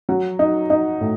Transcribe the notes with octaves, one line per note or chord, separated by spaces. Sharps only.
F#3
D#4
D#4
A2